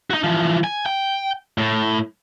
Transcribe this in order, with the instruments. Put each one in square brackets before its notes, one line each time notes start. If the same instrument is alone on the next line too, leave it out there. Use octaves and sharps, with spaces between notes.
[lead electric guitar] D#4 F#4
E3 F3
G#5
G5
A2